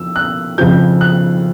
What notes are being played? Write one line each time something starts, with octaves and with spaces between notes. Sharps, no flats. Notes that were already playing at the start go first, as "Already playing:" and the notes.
Already playing: F2 E6
F#6
F2 C#3 F3 G6
F#6